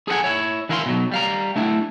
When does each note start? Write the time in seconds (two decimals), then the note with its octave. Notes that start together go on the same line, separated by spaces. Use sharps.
0.08 G#4 A4 B4 F#5 G#5
0.24 E4 C#5
0.69 E3 E4 A#4 F5 B5 C6
0.86 B2 F#3
1.12 G3 F5 A#5
1.56 A3 D4 E4